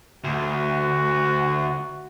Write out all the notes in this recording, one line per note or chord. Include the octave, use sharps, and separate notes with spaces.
D2 F#4